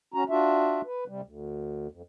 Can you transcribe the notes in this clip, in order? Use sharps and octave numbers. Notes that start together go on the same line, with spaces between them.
C#4 F#4 A#5
D4 F4 F#4 E5
B4
C3 G3
D2
F2